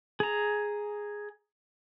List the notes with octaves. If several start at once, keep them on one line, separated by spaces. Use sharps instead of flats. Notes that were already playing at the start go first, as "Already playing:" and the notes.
G#4 A#5